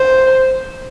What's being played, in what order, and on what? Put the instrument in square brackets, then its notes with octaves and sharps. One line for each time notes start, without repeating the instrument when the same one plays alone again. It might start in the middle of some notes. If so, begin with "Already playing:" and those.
Already playing: [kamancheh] C5